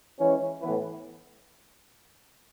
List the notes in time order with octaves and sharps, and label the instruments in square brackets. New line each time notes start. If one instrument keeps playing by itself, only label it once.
[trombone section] E3 G#3 C#4
A2 E3 B3 E4 B4